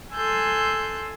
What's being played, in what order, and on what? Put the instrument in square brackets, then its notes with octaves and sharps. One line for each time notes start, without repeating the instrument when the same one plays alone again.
[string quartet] A4 G#5 C6 E6 F#6 G6